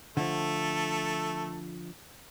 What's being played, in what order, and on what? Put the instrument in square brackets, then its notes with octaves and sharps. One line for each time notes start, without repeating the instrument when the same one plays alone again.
[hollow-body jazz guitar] D3 F3 [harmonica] A3 A4